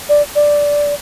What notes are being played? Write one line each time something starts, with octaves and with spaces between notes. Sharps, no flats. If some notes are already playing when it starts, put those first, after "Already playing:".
D5
D5